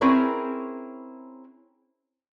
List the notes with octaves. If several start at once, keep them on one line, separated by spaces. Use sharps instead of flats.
C4 C#4 E4 G#4 A#4 B4